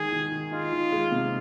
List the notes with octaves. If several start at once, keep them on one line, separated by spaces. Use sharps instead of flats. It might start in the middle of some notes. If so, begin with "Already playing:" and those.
Already playing: D#3 G#3 G#4
D#3
D#3
D#4 F4
D#3
G#3
C3